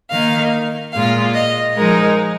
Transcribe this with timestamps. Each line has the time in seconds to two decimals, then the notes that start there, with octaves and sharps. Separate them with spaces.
0.10 D#3 A#3 D#4 F5
0.93 A#2 G#3 F4 F5
1.34 D#5
1.76 F3 G#3 D#4 A#4